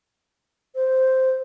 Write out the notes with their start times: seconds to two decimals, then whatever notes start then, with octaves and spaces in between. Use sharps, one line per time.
0.75 C5